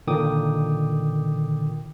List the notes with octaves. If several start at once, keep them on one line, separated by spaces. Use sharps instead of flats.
A#2 D3 D#3 G5 D6 D#6